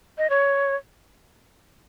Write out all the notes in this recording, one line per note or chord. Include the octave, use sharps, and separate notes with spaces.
D#5
C#5